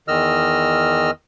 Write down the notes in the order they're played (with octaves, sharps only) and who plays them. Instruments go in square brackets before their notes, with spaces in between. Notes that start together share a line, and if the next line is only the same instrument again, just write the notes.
[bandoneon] E2 D#3 D#5 E6 F6